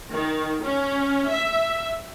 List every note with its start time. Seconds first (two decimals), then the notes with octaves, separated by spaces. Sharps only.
0.12 D#3
0.63 C#4
1.30 E5